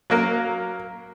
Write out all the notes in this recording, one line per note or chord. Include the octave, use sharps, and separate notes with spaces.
F#3 A#3 A#4